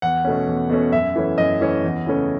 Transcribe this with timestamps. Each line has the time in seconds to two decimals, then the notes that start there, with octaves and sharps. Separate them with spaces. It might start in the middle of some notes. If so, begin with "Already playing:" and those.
0.02 E2 F#5
0.24 B2 A3 C#4
0.48 E2
0.70 B2 A3 C#4
0.92 F#2 E5
1.16 E3 A3 C#4
1.38 F#2 D#5
1.61 E3 A3 C#4
1.84 E2
2.06 C#3 E3 A3 C#4